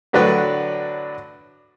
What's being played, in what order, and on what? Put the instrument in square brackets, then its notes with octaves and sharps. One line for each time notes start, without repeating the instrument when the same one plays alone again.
[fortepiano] A2 D3 F#3 D4 B4 D5